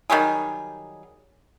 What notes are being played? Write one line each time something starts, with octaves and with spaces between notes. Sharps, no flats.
D#3 F#3 G3 G#4